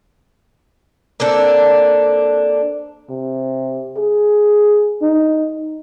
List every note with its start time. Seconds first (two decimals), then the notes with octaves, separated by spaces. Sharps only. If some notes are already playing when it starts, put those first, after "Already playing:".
1.20 A#3 C4 D4 A4
3.10 C3
3.97 G#4
5.02 D#4